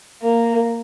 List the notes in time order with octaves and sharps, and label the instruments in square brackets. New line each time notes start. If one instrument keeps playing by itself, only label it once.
[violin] A#3